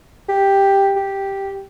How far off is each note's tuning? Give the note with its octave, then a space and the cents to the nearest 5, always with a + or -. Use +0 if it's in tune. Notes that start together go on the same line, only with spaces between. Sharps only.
G4 +5
G4 +0